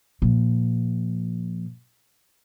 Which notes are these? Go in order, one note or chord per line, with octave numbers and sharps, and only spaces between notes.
A#2 F3